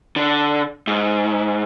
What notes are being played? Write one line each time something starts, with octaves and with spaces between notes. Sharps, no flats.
D3
G#2